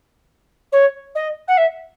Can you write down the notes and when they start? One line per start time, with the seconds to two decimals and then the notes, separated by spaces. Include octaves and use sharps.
0.72 C#5
1.15 D#5
1.48 F#5
1.57 E5